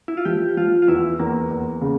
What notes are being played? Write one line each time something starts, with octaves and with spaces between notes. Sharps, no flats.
E4
F4
F3 G4
F3 F4
F4
E2 E4
E2 A#3
E2
C#3